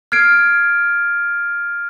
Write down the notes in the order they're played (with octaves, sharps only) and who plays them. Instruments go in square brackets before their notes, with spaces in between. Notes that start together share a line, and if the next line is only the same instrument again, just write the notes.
[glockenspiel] F6 G#6 C7 D7